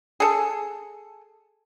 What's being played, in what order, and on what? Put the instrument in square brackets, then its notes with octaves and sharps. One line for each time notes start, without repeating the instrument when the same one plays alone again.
[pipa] G#4 A4